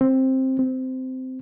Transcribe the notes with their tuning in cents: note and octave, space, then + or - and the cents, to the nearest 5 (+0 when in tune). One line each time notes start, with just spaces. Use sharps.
C4 +10
C4 -15